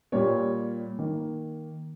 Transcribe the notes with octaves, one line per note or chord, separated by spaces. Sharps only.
A#2 G3 A#3 C#5
D#3 A#3